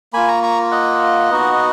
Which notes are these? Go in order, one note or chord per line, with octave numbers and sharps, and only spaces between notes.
A#3 F4 G#5 B5
A#5 C#6
A#5 C#6
D#5 F#5
B3 D#4 F#4